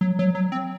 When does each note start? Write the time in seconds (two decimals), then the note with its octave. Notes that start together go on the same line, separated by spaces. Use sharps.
0.01 F#3
0.19 F#3
0.35 F#3
0.52 C4